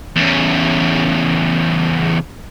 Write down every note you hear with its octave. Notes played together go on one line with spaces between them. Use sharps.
E2 C#3